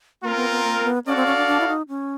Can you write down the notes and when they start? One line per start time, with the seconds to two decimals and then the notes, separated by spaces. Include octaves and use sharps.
0.22 A#3 C4 F4 A#4
0.36 B3
0.51 B3
0.64 A#3
0.80 A#3
0.84 B3
1.06 C#4 F#4 A4 D5 F5
1.16 C4
1.26 C#4
1.37 D4
1.47 D4
1.60 E4
1.68 D#4
1.89 C#4